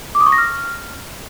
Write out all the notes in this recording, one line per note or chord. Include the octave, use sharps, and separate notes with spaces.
D6
D#6
C#6
A#6
F6